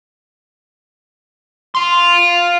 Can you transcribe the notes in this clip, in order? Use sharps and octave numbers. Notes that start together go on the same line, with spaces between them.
F5 C6